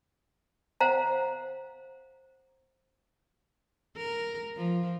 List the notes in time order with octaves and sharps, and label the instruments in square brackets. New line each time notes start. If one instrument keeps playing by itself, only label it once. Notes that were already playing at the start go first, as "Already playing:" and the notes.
[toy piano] C5 F5 F#5 A#5
[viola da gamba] A#4
F3